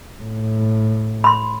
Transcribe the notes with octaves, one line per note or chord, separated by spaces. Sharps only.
A2
B5 C6